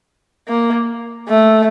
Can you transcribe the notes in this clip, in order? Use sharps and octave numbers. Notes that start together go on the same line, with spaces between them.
A#3
A3